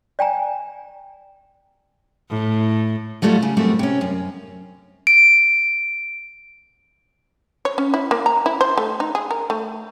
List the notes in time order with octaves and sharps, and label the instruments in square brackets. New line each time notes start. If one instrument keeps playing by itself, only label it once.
[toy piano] D5 G5 G#5 A#5
[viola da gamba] A2
[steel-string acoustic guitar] F#3 G3 A3 B3 E4 F4
C#3
F#2 G3 A3 C4 F#4
C3 C#4
F#2
[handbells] D7
[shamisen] C#5
C#4
E4
A#3
A#5
E4
C5
A3
D#4
G#4
A#4
A3